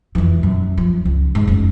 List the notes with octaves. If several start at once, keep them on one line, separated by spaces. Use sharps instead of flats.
F2 E3
F#2
F3
C#2
G#2
F#1 C#4